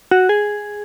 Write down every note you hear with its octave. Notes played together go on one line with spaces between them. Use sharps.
F#4
G#4